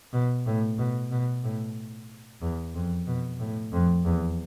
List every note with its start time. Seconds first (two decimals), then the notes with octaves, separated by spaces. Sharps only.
0.13 B2
0.46 A2
0.78 B2
1.12 B2
1.44 A2
2.42 E2
2.74 F2
3.07 B2
3.39 A2
3.73 F2
4.05 E2